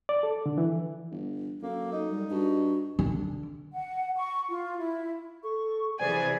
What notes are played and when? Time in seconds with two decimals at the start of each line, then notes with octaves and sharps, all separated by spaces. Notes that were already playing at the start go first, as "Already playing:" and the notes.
0.09 D5
0.23 A4
0.46 D3
0.58 E3
1.11 G1
1.62 F#2 A#3 A4
1.92 D#4
2.10 G3
2.31 G2 F#4
2.99 D3
3.73 F#5
4.16 C#6
4.49 F4
4.79 E4
5.43 A4 C#6
6.00 C3 E3 G#4 B4 C5 D5 G#5